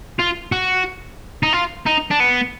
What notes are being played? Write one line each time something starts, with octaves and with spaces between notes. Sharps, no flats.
F4
F#4
D#4
F4
D#4
D4
B3